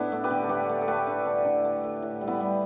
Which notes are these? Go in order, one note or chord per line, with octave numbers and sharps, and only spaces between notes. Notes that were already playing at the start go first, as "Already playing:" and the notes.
Already playing: A2 B3 D4 E4
A3
G4 B4
D3
A4
A3 G4 B4
A3
A4
A3 G4 B4
D3
D3
D3
A3
A3
A2
G3
B3 E4
G3